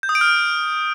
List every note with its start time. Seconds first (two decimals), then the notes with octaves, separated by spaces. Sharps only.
0.03 G6
0.09 D#6
0.15 D7
0.21 F6